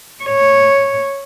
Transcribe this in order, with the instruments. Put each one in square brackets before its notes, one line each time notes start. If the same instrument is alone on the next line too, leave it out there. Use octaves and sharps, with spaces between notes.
[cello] C#5